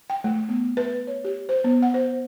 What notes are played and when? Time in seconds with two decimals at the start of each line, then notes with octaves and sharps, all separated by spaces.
0.10 G5
0.24 A3
0.49 B3
0.77 B4
1.07 C#5
1.24 G4
1.49 C5
1.64 B3
1.82 F#5
1.94 C5